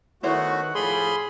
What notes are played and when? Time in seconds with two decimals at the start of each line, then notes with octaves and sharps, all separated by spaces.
0.23 D#3 A3 B3 E4 F#4 C5 C#5 F#5
0.75 A2 F3 G3 G#4 B5 C6